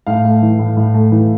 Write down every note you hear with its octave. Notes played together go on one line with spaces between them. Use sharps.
A2 F5
A3
E3
A2
A2
A3
E3